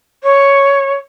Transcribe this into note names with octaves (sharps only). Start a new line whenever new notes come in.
C#5